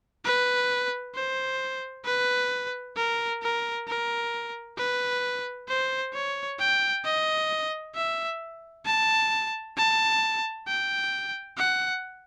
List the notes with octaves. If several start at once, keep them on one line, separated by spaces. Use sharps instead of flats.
B4
C5
B4
A#4
A#4
A#4
B4
C5
C#5
G5
D#5
E5
A5
A5
G5
F#5